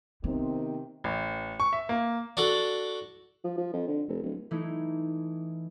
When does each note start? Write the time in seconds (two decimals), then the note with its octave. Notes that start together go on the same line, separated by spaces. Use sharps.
0.24 C3 D#3 B3 C4
1.04 A1
1.60 C#6
1.73 E5
1.89 A#3
2.37 D4 F#4 A4
3.44 F3
3.57 F3
3.74 F2
3.88 D3
4.08 F1
4.23 D1
4.51 E3 A3 D#4 E4